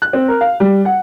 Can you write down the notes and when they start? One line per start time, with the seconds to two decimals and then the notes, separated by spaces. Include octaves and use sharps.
0.02 F#6
0.13 C4
0.28 A#4
0.41 F5
0.60 G3
0.85 F#5